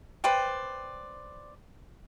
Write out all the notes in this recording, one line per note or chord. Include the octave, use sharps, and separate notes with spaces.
B4 C5 D5 G5